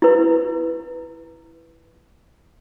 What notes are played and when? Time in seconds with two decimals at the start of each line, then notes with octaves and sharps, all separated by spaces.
0.02 E4 B4